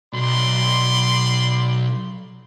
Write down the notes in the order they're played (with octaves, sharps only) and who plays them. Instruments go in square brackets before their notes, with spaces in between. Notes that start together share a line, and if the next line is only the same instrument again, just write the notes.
[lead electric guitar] B1 [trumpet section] D5 B5 C6